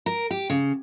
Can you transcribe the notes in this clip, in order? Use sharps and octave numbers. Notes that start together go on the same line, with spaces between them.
A#4
G4
C#3